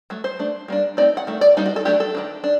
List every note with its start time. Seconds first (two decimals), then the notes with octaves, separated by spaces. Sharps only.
0.10 F#3 A3
0.24 C5
0.39 A3 D4
0.68 G3 A#3 D4
0.97 A3 C4 D#4 D5
1.17 F#5
1.27 D#3 A3
1.41 D5
1.57 G3 A#3 D4 D#4
1.66 F#4
1.76 A4
1.85 F#3 A3 D4 G4
2.00 A4
2.15 D#3 A3 D4
2.44 D4